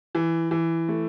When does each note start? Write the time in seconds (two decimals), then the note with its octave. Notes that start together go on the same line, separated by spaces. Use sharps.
0.15 E3
0.51 E3
0.89 A3